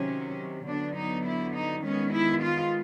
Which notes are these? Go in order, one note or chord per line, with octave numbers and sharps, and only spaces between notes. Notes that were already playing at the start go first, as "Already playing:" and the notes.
Already playing: C3 D#3 F#3 C#4
D3 F#3 B3 D4
D#4
E4
D#4
D#3 G#3 B3 C#4
E4
F4